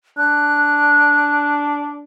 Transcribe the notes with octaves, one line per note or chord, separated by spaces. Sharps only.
D4 F#6